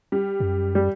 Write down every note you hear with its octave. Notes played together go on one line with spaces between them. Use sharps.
G3
F#2
G3